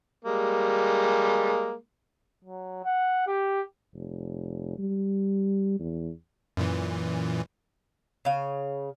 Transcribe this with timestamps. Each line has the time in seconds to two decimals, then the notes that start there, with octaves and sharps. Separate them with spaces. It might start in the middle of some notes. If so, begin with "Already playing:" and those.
0.25 G3 G#3 A#3
2.45 F#3
2.84 F#5
3.27 G4
3.93 F1
4.78 G3
5.80 E2
6.57 F#2 A#2 E3
8.25 C#3 F5